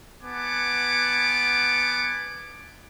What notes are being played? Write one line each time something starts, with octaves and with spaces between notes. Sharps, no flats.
B3 F#5 G#5 A5 D6